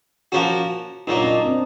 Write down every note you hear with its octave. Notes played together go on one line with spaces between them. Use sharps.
F3 A#3 C#4 F#4
A#2 F#3 A#3 D#4
D4
C#4 D#4
C4 D4